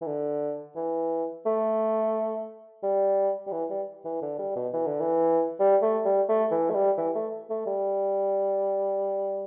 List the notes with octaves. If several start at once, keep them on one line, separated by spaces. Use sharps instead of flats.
E3
D3
E3
A3
G3
G3
E3
G3
E3
D3
G3
B2
E3
D3
E3
G3
A3
G3
A3
E3
A3
G3
E3
A3
A3
G3